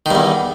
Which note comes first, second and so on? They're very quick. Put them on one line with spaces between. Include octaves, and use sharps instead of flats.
D#3 G2 E2